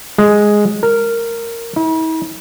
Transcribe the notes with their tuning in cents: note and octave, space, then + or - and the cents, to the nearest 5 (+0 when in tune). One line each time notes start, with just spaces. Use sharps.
G#3 +0
A#4 -10
E4 -45